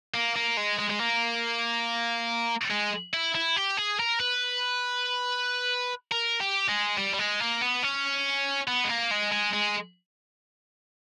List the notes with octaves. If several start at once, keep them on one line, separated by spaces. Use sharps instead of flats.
A#3
A#3
G#3
G#3
G#3
A#3
G#3
E4
E4
G4
G#4
A#4
B4
A#4
G4
G#3
G3
G3
G#3
A#3
B3
C#4
B3
G#3
A#3
G#3
G#3
G#3